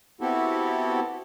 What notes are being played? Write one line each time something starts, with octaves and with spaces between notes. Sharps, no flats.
B3 C4 E4 F#4 G4 A4